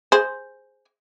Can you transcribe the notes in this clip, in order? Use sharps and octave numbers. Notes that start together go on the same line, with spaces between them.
G#4 C5